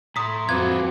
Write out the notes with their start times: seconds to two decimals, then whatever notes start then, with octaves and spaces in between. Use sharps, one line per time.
0.16 A2 A#5 C6 D#6 B6
0.49 F2 C4 F4 F#4 B4 D6 F#6 G#6